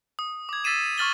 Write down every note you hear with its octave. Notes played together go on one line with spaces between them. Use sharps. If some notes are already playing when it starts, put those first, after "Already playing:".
D#6
D6 G#6
E6 A6 B6 C7 D#7 E7
C#6 D#6 F6 A6 F#7 G7